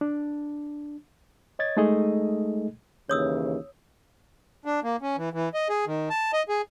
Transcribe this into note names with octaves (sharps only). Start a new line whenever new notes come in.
D4
C#5 D#5 G#6 A6
G#3 A3 D#4 G#4 A4 D#5
D#2 C#3 E3 C#5 D#6 E6
D4
A#3
C#4
E3
E3
D#5
G#4
D#3
A5
D#5
G#4